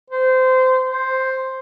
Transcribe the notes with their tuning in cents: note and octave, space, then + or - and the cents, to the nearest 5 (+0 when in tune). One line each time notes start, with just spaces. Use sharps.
C5 -20
C5 +5